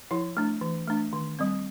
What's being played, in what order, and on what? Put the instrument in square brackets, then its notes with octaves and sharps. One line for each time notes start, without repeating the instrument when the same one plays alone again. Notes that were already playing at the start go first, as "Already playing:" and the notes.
[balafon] F3 E4
A3 D4
E3
A3 D4
D#3
G3 C4